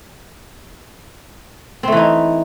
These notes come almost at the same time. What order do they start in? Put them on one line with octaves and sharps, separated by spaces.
C4 A3 E3 D#4